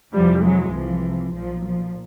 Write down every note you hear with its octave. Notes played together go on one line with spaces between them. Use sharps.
F2 C3 E3 F3 G3
F#3 G#3
C2 C3 E3 F3
B1 A#2 F3
F3